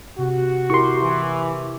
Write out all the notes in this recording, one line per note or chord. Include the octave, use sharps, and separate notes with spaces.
C3 F#4
E4 G4 A#4 C6 C#6
E3